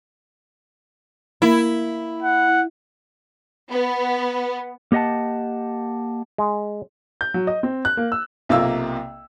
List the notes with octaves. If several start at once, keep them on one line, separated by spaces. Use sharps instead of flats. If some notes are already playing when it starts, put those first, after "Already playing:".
A#3 E4
F#5
B3
A#3 G4 D#5 F#5 A5
G#3
G6
F#3
D#5
C4
F#6
A#3
E6
B1 C3 A#3 F4 E6